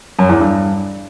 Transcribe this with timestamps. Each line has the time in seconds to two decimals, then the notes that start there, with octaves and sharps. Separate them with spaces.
0.19 F#2
0.29 E2
0.40 G2